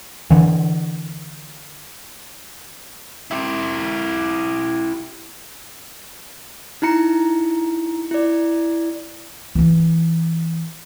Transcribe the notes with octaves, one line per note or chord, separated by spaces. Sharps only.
D3 E3
E4 G4
D#4 E4 A#5 C#7
E4 D5
E3 D#4